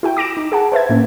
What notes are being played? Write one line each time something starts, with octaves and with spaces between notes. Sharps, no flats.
E4 F#4 G5
D6 A#6 D7 E7
D#4
G#4 F#5 A5
B4 C5 E5 G#6
A2 A#3 C#4